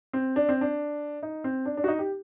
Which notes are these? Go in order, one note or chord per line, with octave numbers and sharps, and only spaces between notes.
C4
D4
C4
D4
D#4
C4
D4
D4
F#4
D#4
G4